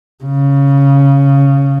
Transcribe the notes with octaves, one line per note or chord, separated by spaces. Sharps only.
C#3